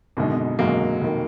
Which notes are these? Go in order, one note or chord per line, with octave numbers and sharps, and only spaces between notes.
G#1 F#2 B2 D3 G#3 D#4
B2
G#1 F#2 D3 F#3 G#3 A#3 D#4
F1 D#3